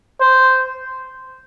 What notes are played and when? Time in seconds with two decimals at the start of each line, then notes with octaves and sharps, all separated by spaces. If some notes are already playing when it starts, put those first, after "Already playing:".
0.21 C5